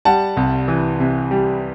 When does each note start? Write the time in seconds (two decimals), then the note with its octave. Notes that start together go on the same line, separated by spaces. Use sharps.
0.05 G3 F#5 A5
0.37 C2
0.68 E3
1.00 C3
1.31 G3